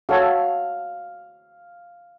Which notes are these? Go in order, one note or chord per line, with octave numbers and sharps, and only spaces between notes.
F#4 A4 C#5 F5